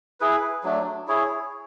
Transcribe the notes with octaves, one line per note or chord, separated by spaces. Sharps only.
E4 G#4 B4
F#3 A3 D4
E4 G#4 C#5